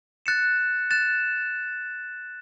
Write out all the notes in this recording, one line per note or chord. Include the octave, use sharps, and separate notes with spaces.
F#6 A6 C#7 E7
F#6 A6 E7